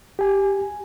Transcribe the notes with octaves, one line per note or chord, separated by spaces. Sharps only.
G4 G#5